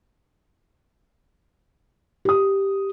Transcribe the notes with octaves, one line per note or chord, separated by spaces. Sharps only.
G4 D#6